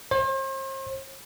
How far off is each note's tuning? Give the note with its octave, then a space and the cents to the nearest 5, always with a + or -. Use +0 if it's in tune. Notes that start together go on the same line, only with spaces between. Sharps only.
C5 +40